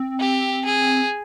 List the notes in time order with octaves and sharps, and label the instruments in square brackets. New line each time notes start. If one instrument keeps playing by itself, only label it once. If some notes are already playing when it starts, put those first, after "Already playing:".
Already playing: [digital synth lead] C4
[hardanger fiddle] G4
G#4